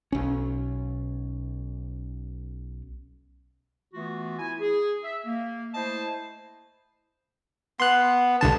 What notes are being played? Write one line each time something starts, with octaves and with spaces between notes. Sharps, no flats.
B1 C#4
E3 A3 B3 F4 F#4
E4 G#5
G#4
E5
A#3
A3 E4 C5 D#5 A5
B3 C6 F#6
C2 D3 A5